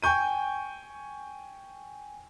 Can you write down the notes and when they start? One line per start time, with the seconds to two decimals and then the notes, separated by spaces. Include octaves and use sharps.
0.03 G5 G#5 C#6 G6 D#7